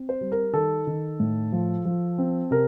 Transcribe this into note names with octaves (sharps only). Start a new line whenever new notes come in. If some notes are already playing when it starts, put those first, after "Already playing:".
Already playing: C4
C5
G3
A#4
D#3 A4
D#3
A2
F3
F3
C4
C3 A#4